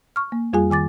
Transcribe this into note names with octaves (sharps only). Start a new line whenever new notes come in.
C#6 F6
A#3
F2 G3 F4 G#4 G#5
D#3 G#5 D6 A6